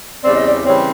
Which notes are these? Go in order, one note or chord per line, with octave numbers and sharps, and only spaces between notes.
E2 C#3 E3 G3 C4 D5
D#5
D5
C#3 E3 G3 C4 C#5